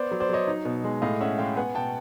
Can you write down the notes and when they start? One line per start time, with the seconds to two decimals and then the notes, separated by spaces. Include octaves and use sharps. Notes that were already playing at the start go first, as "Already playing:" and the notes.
Already playing: B3 C5 D5
0.11 F#3
0.20 C5 D5
0.29 F#3 C#5 D#5
0.47 D#4
0.65 B2
0.84 G#3
1.02 A2 D#5 F5
1.21 C#4 E5 F#5
1.38 G#3 F5 G5
1.57 B3 F#5 G#5
1.75 B2 G5 A5